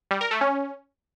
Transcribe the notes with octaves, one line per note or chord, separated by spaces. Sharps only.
G3
A#4
A3
C#4